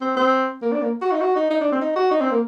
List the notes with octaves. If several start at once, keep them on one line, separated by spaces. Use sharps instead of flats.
C4
C4
A#3
D4
A#3
F#4
D#4
F#4
D#4
D#4
D4
C4
D#4
F#4
D#4
C4
A#3